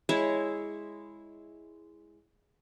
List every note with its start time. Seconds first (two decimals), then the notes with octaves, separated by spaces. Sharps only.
0.09 G#3 E4 C#5 E5